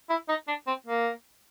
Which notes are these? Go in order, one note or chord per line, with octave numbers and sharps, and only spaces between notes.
E4
D#4
D4
C4
A#3